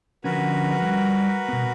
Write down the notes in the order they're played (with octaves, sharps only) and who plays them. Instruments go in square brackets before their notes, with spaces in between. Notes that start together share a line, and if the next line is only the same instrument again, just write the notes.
[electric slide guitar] D3 F3 C#4 [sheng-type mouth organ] F#4 A#4 B4
[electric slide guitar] G3
B2 B3